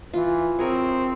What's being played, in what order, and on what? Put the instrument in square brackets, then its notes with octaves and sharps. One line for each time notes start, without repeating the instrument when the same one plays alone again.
[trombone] E3 [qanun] F4
[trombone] C4 [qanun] G#4 A#4 C#5